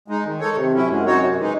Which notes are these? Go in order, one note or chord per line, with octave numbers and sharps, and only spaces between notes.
G#3 D#4
D#3
G#3 D#4 A4 C#5
C3 D#3
F#3 C#4 E4
F#2 G#3
C4 D#4 F#4 C#5
C3
E3 G#3 D#4